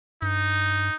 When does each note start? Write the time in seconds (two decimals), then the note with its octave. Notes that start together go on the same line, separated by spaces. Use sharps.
0.22 G2 D#4